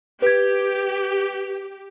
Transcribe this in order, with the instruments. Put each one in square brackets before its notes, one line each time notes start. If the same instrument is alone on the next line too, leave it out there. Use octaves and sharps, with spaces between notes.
[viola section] G4 [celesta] B4 G#6